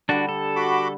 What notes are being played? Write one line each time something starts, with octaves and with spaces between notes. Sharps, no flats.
D3 G3 D4 F#4
A4
F#4 B5 D6